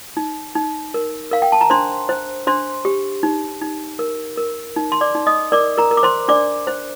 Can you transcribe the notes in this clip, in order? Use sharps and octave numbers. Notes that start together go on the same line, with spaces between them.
D#4
D#4
A#4
A#4 F5
G5
A5
A#5
D4 C5 C6
C5
D4 C5 C6
G4
D#4
D#4
A#4
A#4
D#4
C6
D5 D6
D#4
D#5 D#6
A#4 D5 D6
A#4 A#5
A#4
D6
C5 C6
D4 D5 D6
C5